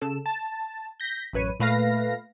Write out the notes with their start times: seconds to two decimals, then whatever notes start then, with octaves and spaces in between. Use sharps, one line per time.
0.01 C#3 A4 E7
0.26 A5
1.00 G6 A#6 B6
1.33 A1 F#2 B4 C#5 D#7
1.60 A#2 A3 B4 F5 A#6